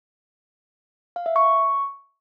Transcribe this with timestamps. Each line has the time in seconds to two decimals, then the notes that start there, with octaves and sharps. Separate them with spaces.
1.16 F5
1.26 E5
1.36 C#6